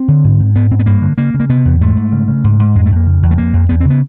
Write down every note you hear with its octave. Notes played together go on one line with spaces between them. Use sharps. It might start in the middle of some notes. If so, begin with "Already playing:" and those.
Already playing: C4
D3
G#2
G#2
G#2 B3
G#2 C4
B3
G2 A#3
D3
C#3 A#3
C#3
A#3
C3 B3
E2
G#2 A3
G#2
C#3
C#3
G#2
G#2
F2 G#3
A3
F2
A#3
C#3
E2
A3
F2 A#3
F2
E2 B3
C4
C#3
B3